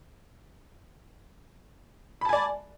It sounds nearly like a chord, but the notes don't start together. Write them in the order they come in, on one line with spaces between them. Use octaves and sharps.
B5 A5 G#5 D5